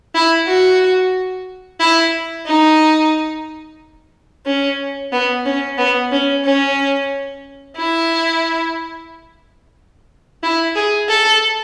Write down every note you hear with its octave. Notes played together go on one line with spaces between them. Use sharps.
E4
F#4
E4
D#4
C#4
B3
C#4
B3
C#4
C#4
E4
E4
G#4
A4